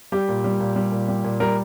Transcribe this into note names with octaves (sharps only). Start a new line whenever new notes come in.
G3 G4
A#2
G3
A#2
G3
A#2
G3
A#2
G3 A#4